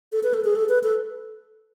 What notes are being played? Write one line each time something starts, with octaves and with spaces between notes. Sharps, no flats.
A4
B4
A4
G#4
A4
B4
A4